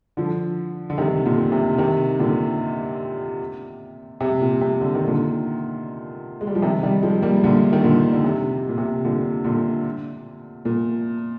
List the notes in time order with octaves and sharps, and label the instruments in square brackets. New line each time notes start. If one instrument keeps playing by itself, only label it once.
[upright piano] D3 F3
D3
C3 D#3
A#2 D3
C3
C3 D#3
A#2 D3
C3
A#2
C3
D3
D#3
A#2 D3
G#3
G3
F3
C3 D#3
D#3 G3
F3 G#3
G3 A#3
A#2 D3
D#3
A#2 D3
D3
C3
A#2
C3
A#2 D3
A#2 D3
A#2